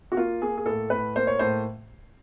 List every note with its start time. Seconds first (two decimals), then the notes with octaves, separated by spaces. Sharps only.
0.12 F#4
0.17 A#3 F4
0.42 A#3 G#4
0.58 G#4
0.66 A2 A4
0.90 A2 B4
1.16 A#3 C5
1.27 C#5
1.39 A2 C5